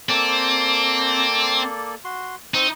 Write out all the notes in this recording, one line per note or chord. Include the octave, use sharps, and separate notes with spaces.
A#3 C4 A4 D5
F#4 C6
C4 D#4 C#6